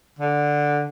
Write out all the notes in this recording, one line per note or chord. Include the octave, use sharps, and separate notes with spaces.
D3